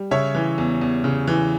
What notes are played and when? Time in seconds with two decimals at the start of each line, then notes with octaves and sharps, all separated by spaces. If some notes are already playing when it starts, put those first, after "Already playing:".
Already playing: G3
0.11 C#3 C#5 E5
0.35 E3
0.58 E2
0.81 E2
1.04 C#3
1.27 E3